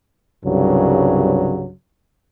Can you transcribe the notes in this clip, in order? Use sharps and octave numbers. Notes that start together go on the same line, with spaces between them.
C2 G2 C#3 F#3